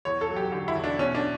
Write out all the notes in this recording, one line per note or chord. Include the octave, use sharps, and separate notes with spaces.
E2 C#5
A4
F#3
G4
D3 G4
E4
E2
D4
B2 C#4
D4